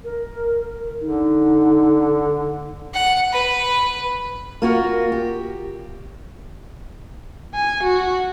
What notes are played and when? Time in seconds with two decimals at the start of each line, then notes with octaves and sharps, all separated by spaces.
0.04 A#4
1.01 D3 D#4
2.94 F#5
3.32 B4
4.62 A#3 F4 F#4
5.12 G4
7.55 G#5
7.84 F#4